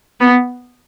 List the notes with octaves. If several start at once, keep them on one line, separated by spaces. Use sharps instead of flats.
B3